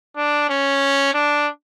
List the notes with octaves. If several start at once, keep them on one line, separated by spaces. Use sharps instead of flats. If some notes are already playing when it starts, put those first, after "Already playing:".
D4
C#4
D4